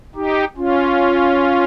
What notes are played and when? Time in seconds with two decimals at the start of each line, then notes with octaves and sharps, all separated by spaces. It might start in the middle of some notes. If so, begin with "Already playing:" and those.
0.15 D#4 G4
0.57 C#4 F4